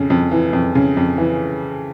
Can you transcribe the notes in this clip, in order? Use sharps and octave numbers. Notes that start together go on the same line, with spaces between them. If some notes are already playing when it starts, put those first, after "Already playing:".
Already playing: F2 C#3
F2
E3
F2
C#3
F2
E3